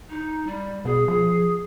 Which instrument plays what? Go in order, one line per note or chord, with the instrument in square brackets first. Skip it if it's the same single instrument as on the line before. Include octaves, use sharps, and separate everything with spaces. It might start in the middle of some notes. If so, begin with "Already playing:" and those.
[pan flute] D#4
G3
[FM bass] B2 [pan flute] G#4
[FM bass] F3 [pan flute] G#4